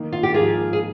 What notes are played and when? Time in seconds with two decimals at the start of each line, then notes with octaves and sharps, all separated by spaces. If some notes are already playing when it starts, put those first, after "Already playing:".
Already playing: D#3 A#3 D#4
0.13 F4
0.23 G4
0.34 G#2 F3 A#3 F4 G#4
0.73 G#4